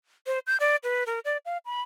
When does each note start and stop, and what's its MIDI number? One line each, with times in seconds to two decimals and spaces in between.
0.27 0.39 72
0.47 0.57 91
0.60 0.76 74
0.84 1.04 71
1.06 1.20 70
1.25 1.37 74
1.45 1.58 77
1.66 1.81 83